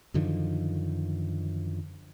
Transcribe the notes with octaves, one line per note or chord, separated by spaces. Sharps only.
F#2 D3 D#3 F3